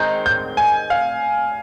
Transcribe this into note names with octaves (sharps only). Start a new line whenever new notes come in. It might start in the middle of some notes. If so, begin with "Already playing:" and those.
Already playing: D#3 G#3 C4 D#4 G6
G6
G#5
F5